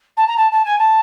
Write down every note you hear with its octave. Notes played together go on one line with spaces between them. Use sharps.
A5
A#5
A5
A5
G#5
A5